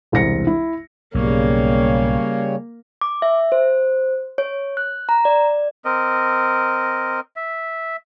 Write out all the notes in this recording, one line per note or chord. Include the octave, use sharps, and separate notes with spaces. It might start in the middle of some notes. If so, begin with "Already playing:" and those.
E1 C2 C5 A#6 C#7
E4
B1 G#2 C#3 G3 A#3 C#5
D6
E5
C5
C#5
F#6
A#5
D5
C4 A#4 D#5
E5